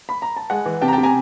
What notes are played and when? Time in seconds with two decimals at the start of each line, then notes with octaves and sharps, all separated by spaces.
0.09 B5
0.22 A#5
0.37 A5
0.50 G#3 F#5 G#5
0.66 E3
0.82 C3 G5 A5
0.88 A#5
0.93 G5 A5
0.98 C3
1.03 G#5 A#5